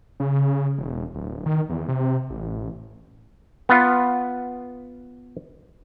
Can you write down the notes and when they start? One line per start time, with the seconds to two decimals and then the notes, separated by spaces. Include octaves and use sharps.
0.20 C#3
0.78 E1
1.15 D1
1.46 D#3
1.69 E2
1.88 C3
2.30 A1
3.69 B3 F4